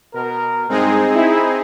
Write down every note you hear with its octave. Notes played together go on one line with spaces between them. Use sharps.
B2 A#4
G2 G#3 C4 D#4 G#4
E4